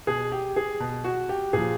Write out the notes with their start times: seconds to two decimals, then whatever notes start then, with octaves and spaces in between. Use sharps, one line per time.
0.07 B2 G#4
0.32 G4
0.56 G#4
0.80 B2
1.04 F#4
1.29 G4
1.53 A#2 F3 G#4